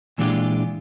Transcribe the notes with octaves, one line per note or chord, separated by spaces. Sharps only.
A#2 E3 G#3 D4 F4 G4